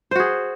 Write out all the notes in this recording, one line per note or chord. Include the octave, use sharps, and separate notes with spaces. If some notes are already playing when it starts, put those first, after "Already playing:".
F#4 G#4 C5